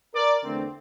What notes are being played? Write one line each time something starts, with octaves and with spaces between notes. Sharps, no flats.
A#4 D5
E2 D3 A3 C4